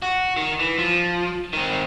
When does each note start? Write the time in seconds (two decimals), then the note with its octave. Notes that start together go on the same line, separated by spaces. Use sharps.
0.02 F#4
0.37 D#3
0.59 E3
0.79 F3
1.53 D#3 C4